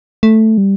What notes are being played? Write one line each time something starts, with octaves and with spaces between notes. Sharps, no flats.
A3
G3